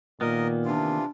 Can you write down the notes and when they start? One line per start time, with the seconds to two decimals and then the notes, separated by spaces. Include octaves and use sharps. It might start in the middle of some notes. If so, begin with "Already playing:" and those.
0.21 A#2 D#3 A#3 B3 A#4 D#5
0.65 C3 E3 D4 F4